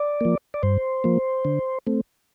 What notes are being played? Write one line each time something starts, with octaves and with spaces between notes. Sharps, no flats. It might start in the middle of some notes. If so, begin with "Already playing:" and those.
Already playing: D5
F3 A#3
D5
G2 C5
F3 A#3
D3
A3 C4